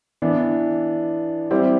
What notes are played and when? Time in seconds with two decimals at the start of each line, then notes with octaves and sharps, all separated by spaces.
0.22 E3 B3 D4
1.51 G3 C4 E4 G4